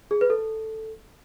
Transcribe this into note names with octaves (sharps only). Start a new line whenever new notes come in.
G#4
B4
A4